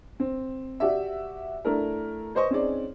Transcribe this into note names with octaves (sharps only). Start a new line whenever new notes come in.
C4
F#4 G4 D5 E5
A3 D4 E4 A#4
B4 C5 D#5 C#6
C4 C#4 D#4 G#4 D5